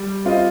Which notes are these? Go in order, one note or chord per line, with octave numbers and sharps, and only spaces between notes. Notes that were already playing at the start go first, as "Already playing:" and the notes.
Already playing: G3
C4 F4 C5 D#5